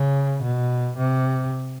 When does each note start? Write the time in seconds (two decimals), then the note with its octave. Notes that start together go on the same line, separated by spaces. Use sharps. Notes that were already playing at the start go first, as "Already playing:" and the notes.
Already playing: C#3
0.43 B2
0.98 C3